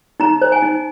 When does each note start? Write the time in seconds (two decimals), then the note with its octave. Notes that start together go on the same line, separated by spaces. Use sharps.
0.20 D#4 A#5
0.41 C5
0.52 G#5
0.62 D#4